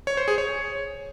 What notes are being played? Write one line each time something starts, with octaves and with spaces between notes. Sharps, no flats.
C#5
C5
G#4
C#5